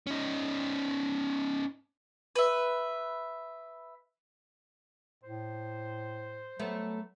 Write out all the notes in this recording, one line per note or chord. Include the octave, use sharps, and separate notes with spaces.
C#4 D#4
B4 E5
A2 C5
F#3 A3 B3